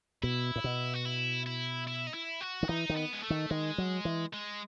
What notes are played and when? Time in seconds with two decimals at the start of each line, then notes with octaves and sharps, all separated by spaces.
0.23 B2 E4
0.56 A2
0.64 B2
0.94 F#4
1.05 E4
1.46 E4
1.87 E4
2.07 D#4
2.14 E4
2.41 F#4
2.63 D#3
2.68 E3 D#4
2.89 D#3
2.96 B3
3.13 G#3
3.23 A3
3.30 D#3
3.50 D#3 G#3
3.78 F#3
4.05 E3
4.33 G#3